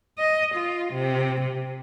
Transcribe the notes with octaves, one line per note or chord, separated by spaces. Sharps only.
D#5
F4
C3
C3